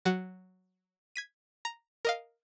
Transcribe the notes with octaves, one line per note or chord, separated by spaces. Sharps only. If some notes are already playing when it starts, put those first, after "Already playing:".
F#3 F#4
G#6 B6 D#7
A#5
A#4 D#5 F5